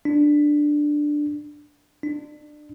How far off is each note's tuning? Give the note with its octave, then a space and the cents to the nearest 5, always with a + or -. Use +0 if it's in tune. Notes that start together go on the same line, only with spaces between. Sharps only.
D4 +5
D4 +25